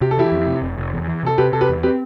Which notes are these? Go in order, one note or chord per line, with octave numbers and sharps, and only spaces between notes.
C3 G4
A4
E3 E4 G4
F2
C3
F1
F1
E2
E3
C3 A4
C3 G4 B4
C3 A4
G4 B4
E2
C4 G4 B4